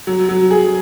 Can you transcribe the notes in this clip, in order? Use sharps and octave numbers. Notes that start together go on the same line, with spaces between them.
F#3
F#3
G#4